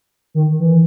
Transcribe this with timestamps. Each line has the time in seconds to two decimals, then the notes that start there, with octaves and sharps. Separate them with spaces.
0.35 D#3
0.60 E3